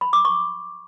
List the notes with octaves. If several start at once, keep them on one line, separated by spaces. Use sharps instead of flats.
B5
D6
C#6